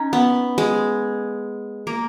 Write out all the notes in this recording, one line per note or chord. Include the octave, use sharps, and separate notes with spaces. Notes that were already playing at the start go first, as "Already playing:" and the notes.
Already playing: C#4 D#4
B3
G#3
A#3